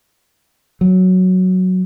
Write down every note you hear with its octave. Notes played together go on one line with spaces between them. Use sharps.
F#3